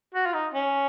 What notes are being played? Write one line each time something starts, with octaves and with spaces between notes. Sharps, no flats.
F#4
F4
D#4
C#4